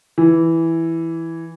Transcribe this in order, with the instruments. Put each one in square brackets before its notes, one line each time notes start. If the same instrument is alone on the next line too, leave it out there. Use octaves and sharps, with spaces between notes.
[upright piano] E3